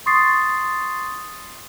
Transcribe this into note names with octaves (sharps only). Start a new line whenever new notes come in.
C6 C#6 D#6 A6 C7